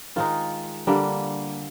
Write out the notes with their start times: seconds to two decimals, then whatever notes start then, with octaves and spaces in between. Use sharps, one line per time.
0.16 D#3 G#3 D#4 F4
0.87 D3 G3 A#3